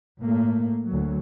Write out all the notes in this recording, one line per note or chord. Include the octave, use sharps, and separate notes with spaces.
A2 A3 A#3
D2 F#3